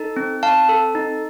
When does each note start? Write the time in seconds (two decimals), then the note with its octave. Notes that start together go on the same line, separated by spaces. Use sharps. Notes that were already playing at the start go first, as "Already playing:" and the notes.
Already playing: D#4 A4
0.16 C4
0.43 C4 F5 A5
0.69 A4
0.95 D#4